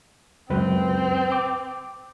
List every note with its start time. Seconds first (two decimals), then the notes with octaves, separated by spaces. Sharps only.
0.50 C#2 F#2 C4 B4
1.32 D6